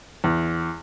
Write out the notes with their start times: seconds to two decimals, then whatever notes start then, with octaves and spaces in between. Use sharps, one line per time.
0.24 E2